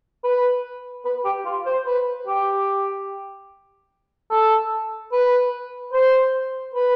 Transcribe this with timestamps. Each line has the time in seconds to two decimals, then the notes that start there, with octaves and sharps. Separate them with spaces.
0.24 B4
1.05 B4
1.25 G4
1.45 F4
1.66 C5
1.86 B4
2.27 G4
4.31 A4
5.12 B4
5.93 C5
6.74 B4